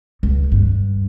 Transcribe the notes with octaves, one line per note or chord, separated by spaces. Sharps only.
C#2
G2